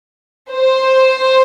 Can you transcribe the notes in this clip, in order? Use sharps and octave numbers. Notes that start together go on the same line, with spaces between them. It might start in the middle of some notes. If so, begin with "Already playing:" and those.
C5